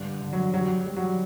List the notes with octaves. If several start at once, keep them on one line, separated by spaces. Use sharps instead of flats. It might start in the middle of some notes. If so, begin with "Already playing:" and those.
Already playing: G2 D3
D3
F#3
F#3 G3
G3
F#3